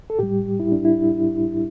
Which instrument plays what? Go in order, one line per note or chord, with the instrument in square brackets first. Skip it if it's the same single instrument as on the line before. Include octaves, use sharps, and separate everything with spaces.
[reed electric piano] A4
A2 G3 G4
E4
D4
E4